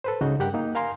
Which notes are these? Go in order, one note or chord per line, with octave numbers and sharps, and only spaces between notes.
A4 B4 C5
C#2 C#3 D#4 F#4 D#5
G2 G3 G4 A#4 F#5 G5
A#3 D#4
A#4 F5 G#5 A#5 C6